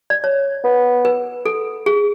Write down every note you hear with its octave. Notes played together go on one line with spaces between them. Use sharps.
D5
C#5
B3
B4
A4
G#4